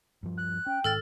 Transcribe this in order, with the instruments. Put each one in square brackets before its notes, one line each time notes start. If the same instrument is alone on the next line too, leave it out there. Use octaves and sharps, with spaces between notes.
[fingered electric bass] G2 F3
[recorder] F#6
[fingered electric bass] C#4 [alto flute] G5
[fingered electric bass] G#2 D#3 [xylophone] A4 F6 A6